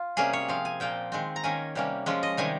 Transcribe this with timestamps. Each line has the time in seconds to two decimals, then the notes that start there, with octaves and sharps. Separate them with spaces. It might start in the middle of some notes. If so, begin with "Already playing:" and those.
Already playing: F4
0.17 C3 G3 A#3 C#4 G#4
0.33 C#5
0.48 F3 C4 F5
0.65 G#5
0.80 A#2 F3 A#3 G5
1.12 D#3 G#3 C4
1.36 A#5
1.44 D#3 A#3 C#4 G#5
1.75 C3 G3 A#3 C#4
2.06 F3 G#3 C#4
2.23 D#5
2.37 C3 D#3 G3 G#5